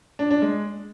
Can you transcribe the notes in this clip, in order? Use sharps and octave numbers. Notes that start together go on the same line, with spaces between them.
D4
D4
G#3